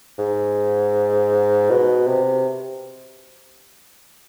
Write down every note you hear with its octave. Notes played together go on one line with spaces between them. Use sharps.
G#2
B2
C3